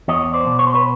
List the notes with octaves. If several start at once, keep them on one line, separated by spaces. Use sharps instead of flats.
E2 C#5 D#5
C5 D5
B2
C#5
C5
B4 C#5